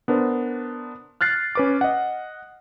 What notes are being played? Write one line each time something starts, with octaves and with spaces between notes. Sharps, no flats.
B3 D4 A#4 C5
F6 F#6 A6 C7
C#4 B4 D6
D#5 F#5